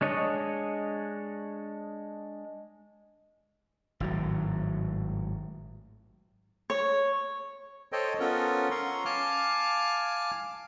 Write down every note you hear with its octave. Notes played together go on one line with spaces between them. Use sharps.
G#3 D4 C#5 D#5
G#1 A2 F#3
C#5
A4 C5 C#5 D#5 G5
B3 C#4 F4 A4 A#4
C#4 A#5 C6 C#6
F5 G#5 A5 D6 F6